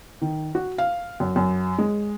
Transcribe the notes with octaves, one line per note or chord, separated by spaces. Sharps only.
D#3
F#4
F5
F#2
F#2
G#3